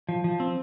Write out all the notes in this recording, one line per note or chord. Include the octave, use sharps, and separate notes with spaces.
F3
F3
C4